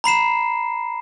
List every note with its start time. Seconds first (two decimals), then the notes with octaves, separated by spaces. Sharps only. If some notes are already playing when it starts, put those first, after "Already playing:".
0.04 A#5 B5 C7 E7